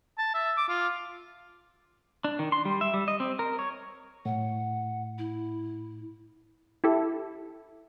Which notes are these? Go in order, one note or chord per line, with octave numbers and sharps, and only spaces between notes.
A5
E5
D6
F4
D4
D#3
C6
G3
E5
G3
D#5
C4
A#4
C#5
A2 F#5
E4
E4 G4 A4